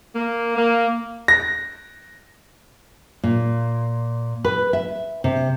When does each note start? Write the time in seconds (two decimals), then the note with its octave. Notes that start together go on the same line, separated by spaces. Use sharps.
0.15 A#3
0.56 A#3
1.28 A#6
3.23 A#2
4.45 B4
4.73 E5
5.24 C3